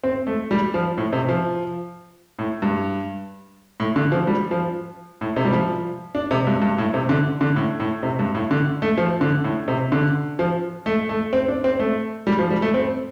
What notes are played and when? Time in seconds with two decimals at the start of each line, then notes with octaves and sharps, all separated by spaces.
0.04 C4
0.27 A3
0.51 G3
0.74 F3
0.98 A2
1.13 C3
1.29 F3
2.39 A2
2.62 G2
3.80 A2
3.96 D3
4.12 F3
4.27 G3
4.51 F3
5.21 A2
5.36 C3
5.45 G3
5.52 F3
6.15 D4
6.31 C3
6.47 G2
6.62 G2
6.78 A2
6.94 C3
7.09 D3
7.41 D3
7.56 A2
7.80 A2
8.03 C3
8.19 G2
8.35 A2
8.51 D3
8.82 A3
8.97 F3
9.21 D3
9.44 A2
9.68 C3
9.92 D3
10.39 F3
10.86 A3
11.09 A3
11.33 C4
11.48 D4
11.64 C4
11.79 A3
12.27 G3
12.39 F3
12.51 G3
12.62 A3
12.74 C4